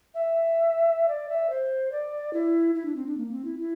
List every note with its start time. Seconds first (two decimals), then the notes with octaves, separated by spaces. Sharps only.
0.14 E5
1.08 D5
1.29 E5
1.50 C5
1.92 D5
2.33 E4
2.75 E4
2.85 D4
2.96 C4
3.07 D4
3.18 A#3
3.31 C4
3.45 E4
3.59 E4